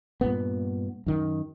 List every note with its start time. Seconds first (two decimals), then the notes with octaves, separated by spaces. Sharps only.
0.21 G2 A#2 B3
1.06 F#2 D#3